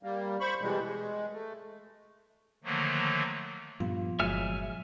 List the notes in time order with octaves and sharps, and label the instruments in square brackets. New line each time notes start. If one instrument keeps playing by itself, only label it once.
[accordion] G3 A#3
C5 B5 C#6
B2 E3 G3 G#3
G#3
A3
[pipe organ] D3 D#3 F3 F#3 A3 A#3
[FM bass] G2 [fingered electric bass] A#2 F3 B3 [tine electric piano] F4
[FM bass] G1 [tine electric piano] F#3 G#3 [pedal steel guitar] E5 G#5 F6